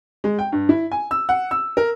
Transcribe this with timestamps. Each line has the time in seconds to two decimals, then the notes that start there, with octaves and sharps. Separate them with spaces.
0.24 G#3
0.39 G5
0.52 G2
0.69 E4
0.92 G#5
1.11 E6
1.29 F#5
1.51 E6
1.77 A#4